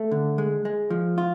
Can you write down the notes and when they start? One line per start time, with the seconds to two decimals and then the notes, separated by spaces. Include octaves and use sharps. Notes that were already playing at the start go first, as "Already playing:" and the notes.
Already playing: A3
0.11 D3
0.38 G#3
0.65 G#3
0.90 F3
1.18 F4